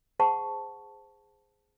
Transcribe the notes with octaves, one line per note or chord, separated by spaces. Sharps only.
G#4 C5 F#5 A5 C#6